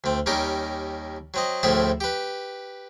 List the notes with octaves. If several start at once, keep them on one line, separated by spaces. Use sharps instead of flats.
D2 C4
D#2 G3 C#4 D#4 A#4 D6
F#3 C4 D#5
D2 A2 F3 C4 G#4 E5
G4 B4